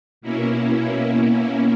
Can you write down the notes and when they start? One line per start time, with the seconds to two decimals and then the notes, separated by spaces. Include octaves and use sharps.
0.21 B2 A#3 C#4 E4